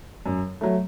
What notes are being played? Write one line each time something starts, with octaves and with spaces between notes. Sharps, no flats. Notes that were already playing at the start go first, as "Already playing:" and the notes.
F#2
F#3 A3